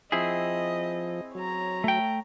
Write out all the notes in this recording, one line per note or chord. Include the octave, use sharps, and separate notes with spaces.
F3 C4 E4 G#4 D#5
F#3 C#5 A#5
A3 G5